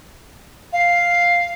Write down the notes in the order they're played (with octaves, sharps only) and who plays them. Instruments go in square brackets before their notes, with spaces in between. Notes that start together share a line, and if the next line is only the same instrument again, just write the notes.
[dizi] F5